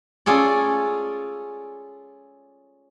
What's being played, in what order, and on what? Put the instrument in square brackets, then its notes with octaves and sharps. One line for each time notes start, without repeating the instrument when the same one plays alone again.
[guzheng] C#4 F4 G#4 A4 D5